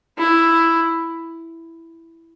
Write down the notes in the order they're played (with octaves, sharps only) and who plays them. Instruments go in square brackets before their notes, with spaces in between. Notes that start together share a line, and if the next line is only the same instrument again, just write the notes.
[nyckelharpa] E4